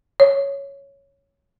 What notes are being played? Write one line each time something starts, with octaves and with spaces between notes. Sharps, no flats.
C#5